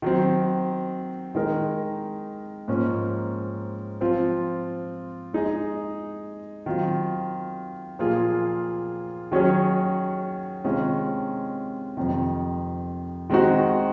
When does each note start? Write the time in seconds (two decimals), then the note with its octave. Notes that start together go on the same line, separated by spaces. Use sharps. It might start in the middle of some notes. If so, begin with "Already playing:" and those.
0.02 D#3 F#3 C4
1.35 D#3 G#3 D#4 A#4
2.68 G#2 F3 A#3 C#4
4.01 F3 C4 F4
5.33 G#3 D#4 G#4 D#5
6.66 D#3 F#3 C4 F4
7.99 A#2 F3 A#3 F4 G#4
9.32 D#3 F#3 C#4 G#4 C#5
10.64 C3 D#3 G#3 C#4 F4
11.97 F2 C3 D#3
13.30 D#3 G#3 C4 D#4 F#4